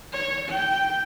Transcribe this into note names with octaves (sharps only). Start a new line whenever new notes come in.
C#5
G5